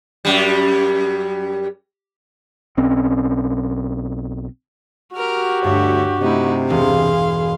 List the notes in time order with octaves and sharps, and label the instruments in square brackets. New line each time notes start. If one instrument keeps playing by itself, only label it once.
[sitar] F#2 G3
[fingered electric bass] B1 C4 C#4
[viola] F#4 G4 [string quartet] A#4 F6
[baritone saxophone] D2 [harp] G2 [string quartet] C#5 E5
[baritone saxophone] C3 [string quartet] A3 D#4 E4
[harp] E1 [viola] G#4 [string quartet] F5 C6